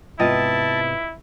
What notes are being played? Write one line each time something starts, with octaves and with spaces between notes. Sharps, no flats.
G#2 C3 B3 E4 F4 D#5 G5 A5